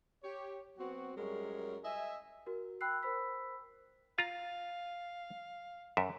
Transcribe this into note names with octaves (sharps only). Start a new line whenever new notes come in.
G4 C#5
F#3 B3 C4 F#4
F#2 G3 G#3 A#4 C#5
D#5 E5 G#5
F#4 A#4
G5 B5 E6 F#6 C7
A#4 C5 B5 E6 B6
F4 F5 A#5
F#2 E5